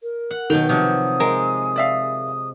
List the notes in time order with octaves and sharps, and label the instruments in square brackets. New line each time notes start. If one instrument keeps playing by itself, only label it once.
[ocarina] A#4
[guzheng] F#5
[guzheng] B2 F#3 G5 [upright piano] D#3 F7
[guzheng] C3 F3 F#3 [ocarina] D#6
[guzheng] G#3 [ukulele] A#4
[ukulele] D5 E5 F5